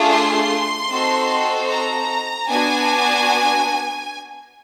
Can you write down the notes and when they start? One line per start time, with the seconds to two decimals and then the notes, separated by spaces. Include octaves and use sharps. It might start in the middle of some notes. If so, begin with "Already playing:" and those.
Already playing: A3 D4 F4 G#4
0.10 C6
0.89 C4 D#4 F#4 A4
1.69 A#5
2.48 B3 D4 F#4 G#5